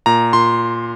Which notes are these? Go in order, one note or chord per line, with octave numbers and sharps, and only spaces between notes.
A#2 A#5
A#2 C6